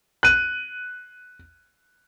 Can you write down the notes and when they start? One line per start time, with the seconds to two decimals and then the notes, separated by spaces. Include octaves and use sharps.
0.23 F#6 D#7